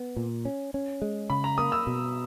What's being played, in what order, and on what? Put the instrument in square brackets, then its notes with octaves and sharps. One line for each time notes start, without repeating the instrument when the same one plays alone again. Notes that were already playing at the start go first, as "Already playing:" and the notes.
Already playing: [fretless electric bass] B3
A#2
C#4
C#4
G#3
[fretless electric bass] C#3 [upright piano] B5
[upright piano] A#5
[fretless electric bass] A#3 [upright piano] D#6
[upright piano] E6
[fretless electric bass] B2